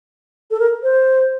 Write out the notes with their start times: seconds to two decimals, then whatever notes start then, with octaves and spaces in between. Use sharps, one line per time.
0.51 A4
0.60 A#4
0.83 C5